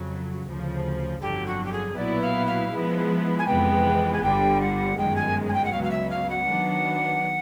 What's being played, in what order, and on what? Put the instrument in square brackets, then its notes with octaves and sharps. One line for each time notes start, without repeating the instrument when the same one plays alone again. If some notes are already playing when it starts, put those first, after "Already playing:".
Already playing: [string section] F2 C#3 F#3
D2 C#3 F3
[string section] G1 F2 D3 F#3 [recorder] G4
[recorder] F#4
G4
G#4
[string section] B1 A#2 F#3 B3 E4 [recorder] D5
[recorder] F5
F5
[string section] F3 G#3 B3 E4
[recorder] G#5
[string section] F2 C3 E3 G#3 B3 [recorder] G5
[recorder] G#5
[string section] G1 G2 D3 G3 [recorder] G5
[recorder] F#5
[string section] G1 F#2 D#3 G#3 [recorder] G5
[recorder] G#5
G#5
G5
F#5
[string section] C#2 B2 F#3 [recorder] F5
[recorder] F5
E5
F5
F#5
[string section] D#3 F#3 B3 D4